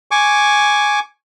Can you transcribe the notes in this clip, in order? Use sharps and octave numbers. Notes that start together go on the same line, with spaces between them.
G#5 C#6 D6